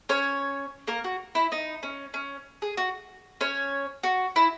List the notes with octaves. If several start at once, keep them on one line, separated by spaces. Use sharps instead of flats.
C#4 C#5
A#3 A#4
F#4
E4
D#4
C#4
C#4
G#4
F#4
C#4 C#5
F#4
E4